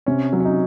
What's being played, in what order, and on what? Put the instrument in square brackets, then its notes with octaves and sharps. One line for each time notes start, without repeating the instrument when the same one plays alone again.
[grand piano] C3 [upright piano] C#4
[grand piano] F#3
[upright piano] C#4
D#4